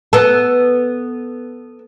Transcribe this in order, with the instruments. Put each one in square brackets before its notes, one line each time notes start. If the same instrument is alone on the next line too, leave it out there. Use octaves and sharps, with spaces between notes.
[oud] B3 A4